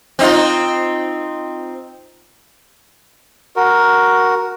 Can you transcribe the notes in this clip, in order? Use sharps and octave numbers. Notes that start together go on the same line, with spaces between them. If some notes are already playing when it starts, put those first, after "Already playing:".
C4 D#4 F4
F#4 A#4